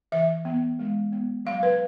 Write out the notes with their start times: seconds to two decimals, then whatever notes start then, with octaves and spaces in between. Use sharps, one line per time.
0.12 E3 E5
0.45 B3
0.79 G#3
1.12 B3
1.45 F#3 F5
1.63 B4